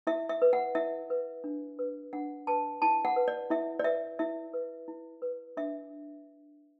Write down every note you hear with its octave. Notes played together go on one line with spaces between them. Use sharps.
E4 E5
E5
B4
F#5
E4 E5
B4
D4
B4
D4 F#5
B4 A5
E4 A5
F#5
B4
D5
E4 E5
D5
B4 E5
E4 E5
B4
E4
B4
D4 E5